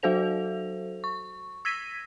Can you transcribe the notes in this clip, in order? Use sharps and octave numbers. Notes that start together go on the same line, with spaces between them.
F#3 F#4 A4 C5 F7
C#6
E6 G#6 A#6 B6 D#7